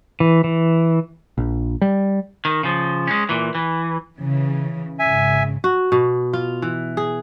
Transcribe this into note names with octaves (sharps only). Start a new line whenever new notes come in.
E3
E3
A#1
G3
D#3
C#3 F3
G#3 C#4
A#2 E3
E3
C#3 E3
G#1 C#3 E5 G#5
F#4
B2
F4
E3
G#4